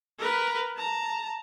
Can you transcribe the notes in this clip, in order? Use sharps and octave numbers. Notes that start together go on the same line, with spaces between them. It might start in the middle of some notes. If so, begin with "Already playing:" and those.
A#4 B4
A5 A#5